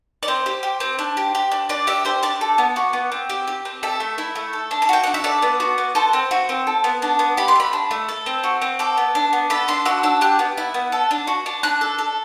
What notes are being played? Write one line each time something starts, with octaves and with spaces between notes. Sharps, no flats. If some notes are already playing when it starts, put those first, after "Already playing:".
D5
C4 C5
G4
G4
C4
D4
G4
G4
D4
D4 D5
G4 E5
G4 C5
D4 D5
A4
B3
F#4
B3
C4
G4
G4
C4
A4 E5
A3
E4
A3
A4
D4
A5
F#4 G5
D4 F#5
E5
A4 D5
B3
F#4
B3
A4 C5
C4
F#4
C4
A4
B3
D4
B3
G4 B5
C6
A3 B5
D4
A3
A4
C4
F#4
C4
A4 D6
B3
D4
B3
A4 B5
D4 C6
F#4 E6
D4 E6
G4 F#6
B3
E4
B3
A4
D4
F#4
D4
D4 F#6
A4
A4